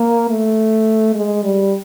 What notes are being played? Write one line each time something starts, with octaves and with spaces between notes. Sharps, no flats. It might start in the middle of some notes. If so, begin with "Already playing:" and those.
Already playing: A#3
A3
G#3
G3